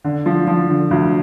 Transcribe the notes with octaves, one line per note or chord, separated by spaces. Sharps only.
D3
F3
F3
D3
D2